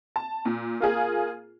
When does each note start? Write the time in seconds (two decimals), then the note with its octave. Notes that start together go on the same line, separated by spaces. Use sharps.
0.16 A5
0.45 A#2
0.80 A#3 F4 G#4